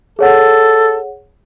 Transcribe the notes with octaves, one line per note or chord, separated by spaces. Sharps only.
G#4 A4 C#5 F#5